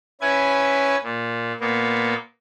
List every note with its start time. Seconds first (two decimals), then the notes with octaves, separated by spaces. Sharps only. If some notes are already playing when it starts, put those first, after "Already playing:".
0.21 C#4 E4 B4 G#5 G#6
1.04 A#2
1.60 A#2 A#3 B3